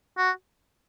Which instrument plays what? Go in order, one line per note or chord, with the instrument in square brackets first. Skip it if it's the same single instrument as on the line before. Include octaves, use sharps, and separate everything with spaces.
[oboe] F#4